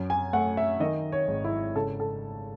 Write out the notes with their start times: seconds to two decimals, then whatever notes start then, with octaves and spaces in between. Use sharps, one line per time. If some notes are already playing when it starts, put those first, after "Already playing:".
Already playing: F#2
0.10 G#5
0.33 A3 F#5
0.57 E5
0.80 D#3 D#5
1.12 C#5
1.28 G#1
1.44 E4
1.75 C#3 A4
2.00 A4